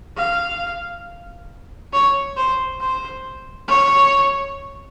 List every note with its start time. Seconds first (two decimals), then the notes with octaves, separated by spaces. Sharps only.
0.16 F5
1.93 C#5
2.37 C5
2.80 C5
3.68 C#5